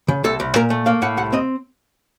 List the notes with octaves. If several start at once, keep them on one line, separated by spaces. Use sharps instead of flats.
C#3
C2 A4
C2
A#2 A#4
A3
A#3 F5
A2 F#5
C2 F#5
C4 D#5